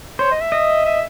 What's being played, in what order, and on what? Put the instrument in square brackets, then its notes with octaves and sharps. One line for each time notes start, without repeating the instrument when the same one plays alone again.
[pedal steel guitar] C5 [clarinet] C#5
[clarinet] D#5
E5
[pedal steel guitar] D#5
[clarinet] E5